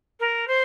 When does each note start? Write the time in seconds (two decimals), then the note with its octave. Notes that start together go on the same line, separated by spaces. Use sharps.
0.20 A#4
0.47 C5